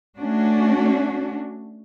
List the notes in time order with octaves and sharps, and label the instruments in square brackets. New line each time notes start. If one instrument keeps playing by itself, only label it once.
[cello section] A3 C#4 D4 F#4